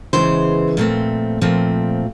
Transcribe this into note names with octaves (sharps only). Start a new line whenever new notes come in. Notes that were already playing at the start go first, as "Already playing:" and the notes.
E2 C#3 E3 G#3 C5
A#2 F3 A3 C4
A#2 F3 A3 C4